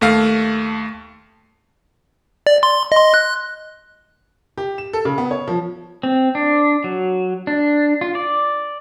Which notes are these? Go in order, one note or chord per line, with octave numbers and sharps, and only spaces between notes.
D#2 A3 F5
D5
C6
D#5 C6
F#6
G4
E7
A4
C#3
B3
C#5
F3
C4
D4
F#3
D4
F4
D5